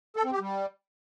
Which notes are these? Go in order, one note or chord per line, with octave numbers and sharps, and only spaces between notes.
A4
C4
G4
G3